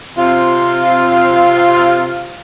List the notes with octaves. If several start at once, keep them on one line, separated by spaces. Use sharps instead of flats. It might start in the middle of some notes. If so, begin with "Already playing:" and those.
C3 C4 F4